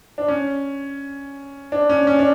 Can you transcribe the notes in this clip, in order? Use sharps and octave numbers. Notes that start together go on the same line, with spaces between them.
D4
C#4
D4
C#4
C#4
D4